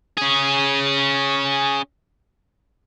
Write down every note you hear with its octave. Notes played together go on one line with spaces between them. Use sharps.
C#4 G#4